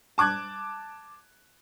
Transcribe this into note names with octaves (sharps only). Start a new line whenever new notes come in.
A5 D6 F#6 G#6